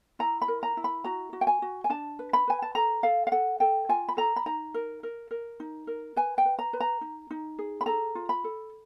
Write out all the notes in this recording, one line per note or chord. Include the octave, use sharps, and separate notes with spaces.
E4 A#5
B5
A#4
A#5
E4
B5
F#4 A#5
F#4
G5
G#5
F#4
G#5
D4 A5
B4
B5
B4 G#5
A5
A4 A#5
A4 F5
F5
A4 F#5
A4 G5
F4 G#5
B5
A4 A#5
B5
D#4 A#5
A#4
A#4
A#4
D#4
A#4
B4 G#5
G5
B4
A#5
B4
A#5
D#4
D#4
G#4
B5
A4 A#5
F4
B5
A4